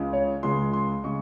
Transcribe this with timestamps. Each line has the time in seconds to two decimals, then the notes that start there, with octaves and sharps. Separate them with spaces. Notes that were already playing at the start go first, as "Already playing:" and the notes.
Already playing: C#2 C#3 G#3
0.13 C#5
0.43 C#2 C#3 G#3 C6
0.73 C6
1.04 C#3 G#3 C#6